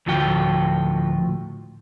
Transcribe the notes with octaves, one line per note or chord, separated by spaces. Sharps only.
D2 A2 F3 F#4 G5